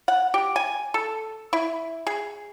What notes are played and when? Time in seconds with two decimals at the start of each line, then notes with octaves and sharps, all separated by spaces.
0.08 F#5
0.34 G4
0.56 G#5
0.94 A4
1.53 E4
2.07 G#4